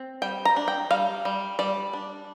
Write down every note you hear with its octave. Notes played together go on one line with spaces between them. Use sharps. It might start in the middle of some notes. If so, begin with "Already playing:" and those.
Already playing: C4
G3 G5
A#5
D4
G5
G3 F5
G3
G3 D5
D4